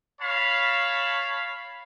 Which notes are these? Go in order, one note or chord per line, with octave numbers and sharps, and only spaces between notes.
C#5 F5 A5 B5